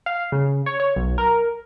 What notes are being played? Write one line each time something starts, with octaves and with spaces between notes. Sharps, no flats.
F5
C#3
C#5
C#5
B1
A#4